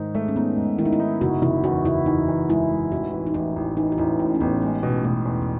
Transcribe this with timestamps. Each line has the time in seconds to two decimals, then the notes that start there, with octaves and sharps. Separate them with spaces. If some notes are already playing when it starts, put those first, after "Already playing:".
Already playing: G#2 D#3 D#4
0.15 G#3 A3
0.28 C#4
0.36 B3 D#4
0.57 G#2
0.78 D#3 E4
0.85 D#4
0.93 E4
1.00 D#4
1.21 F#1 F#4
1.42 F#1 E4
1.64 E2 F#4
1.85 F#1 E4
2.06 E2 D#4
2.28 E2
2.49 G#3 E4
2.70 G#3
2.92 A1 F#4
3.13 E3
3.27 D#4
3.34 A1 E4
3.56 A1
3.76 E3 D#4
3.92 F#4
3.98 A1 E4
4.19 A2 C#4
4.35 C#4
4.40 A1 B3
4.62 G#3 B3
4.83 B2
5.05 B2 A3
5.25 E2
5.42 B2